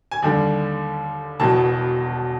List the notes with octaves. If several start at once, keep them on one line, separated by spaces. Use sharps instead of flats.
G#5
D#2 D3 G3 G5
E1 E2 B2 A5